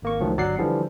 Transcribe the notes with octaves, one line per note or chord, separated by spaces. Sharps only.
G#1 A#3 C#6
C#2 D#3 F3 F#3 A3
G1 F#3 D5 F#5 C7
D3 E3 F3 G3